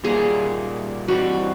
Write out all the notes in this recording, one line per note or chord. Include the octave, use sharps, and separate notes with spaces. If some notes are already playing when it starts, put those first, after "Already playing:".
A#2 G3 A#3 G#4
E3 G3 C4 F#4